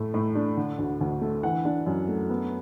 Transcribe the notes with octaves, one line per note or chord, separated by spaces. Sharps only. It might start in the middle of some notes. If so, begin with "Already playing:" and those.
Already playing: A2 A3
A2
D4
D3
D2
D2
A3
E3 F#5
D4
F#2
A3
B3